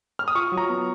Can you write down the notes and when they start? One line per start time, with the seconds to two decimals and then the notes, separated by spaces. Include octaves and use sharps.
0.19 F6
0.28 D#6
0.35 F4 C#6
0.52 F#3
0.57 A#5
0.69 B3